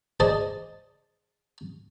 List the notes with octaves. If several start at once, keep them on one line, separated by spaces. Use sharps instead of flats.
G#4 C5 D5 D#5 A5